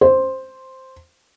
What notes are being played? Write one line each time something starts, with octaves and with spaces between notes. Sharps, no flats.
C5